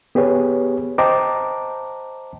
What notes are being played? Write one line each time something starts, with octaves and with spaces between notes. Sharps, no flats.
B3 G4 G#4 B4 C#5
C5 D#5 G5 A5 A#5 D6